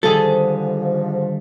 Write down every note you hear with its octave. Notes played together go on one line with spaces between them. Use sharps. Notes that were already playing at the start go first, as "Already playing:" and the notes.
G#2 D3 D#3 F3 G3 G#4 A4